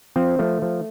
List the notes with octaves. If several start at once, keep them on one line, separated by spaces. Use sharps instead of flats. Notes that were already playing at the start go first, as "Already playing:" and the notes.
F3 C4
F3 A3
F3